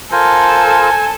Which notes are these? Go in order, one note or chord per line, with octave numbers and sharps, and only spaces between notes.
F4 A4 A#4 C5 G#5